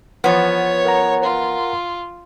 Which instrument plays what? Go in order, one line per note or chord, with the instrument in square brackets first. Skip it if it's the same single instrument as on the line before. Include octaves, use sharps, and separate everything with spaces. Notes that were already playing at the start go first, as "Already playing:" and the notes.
[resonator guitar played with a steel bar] E2 F3 B3 [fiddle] C#5
[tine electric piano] A#4 F#5 A#5
[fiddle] F4